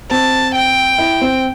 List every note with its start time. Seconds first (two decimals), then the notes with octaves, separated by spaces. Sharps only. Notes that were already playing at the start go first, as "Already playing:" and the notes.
0.11 C4 A5
0.55 G5
0.98 E4
1.21 C4